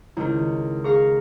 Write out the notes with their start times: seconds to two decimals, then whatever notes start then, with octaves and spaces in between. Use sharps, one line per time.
0.17 C#2 D#3 E4
0.84 G#4 F5 A#5 C#6